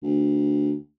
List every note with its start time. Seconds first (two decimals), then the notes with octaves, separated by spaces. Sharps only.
0.03 D2